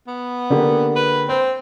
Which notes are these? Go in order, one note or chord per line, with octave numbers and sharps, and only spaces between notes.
B3
D3 A#3 G4
B4
C4 C5